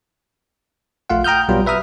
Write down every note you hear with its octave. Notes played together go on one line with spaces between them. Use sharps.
A#1 A3 F4 F5 F#5
G5 A#5 D#6 F6 G6
B1 F#3 G3 B3 F4
B4 E5 A#5 D#6 F6